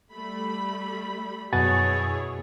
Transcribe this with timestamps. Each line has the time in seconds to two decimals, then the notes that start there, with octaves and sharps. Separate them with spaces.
0.12 G3 A3 B5
1.53 F#2 B2 E4 G#4 C#5 F#5 G#5 A6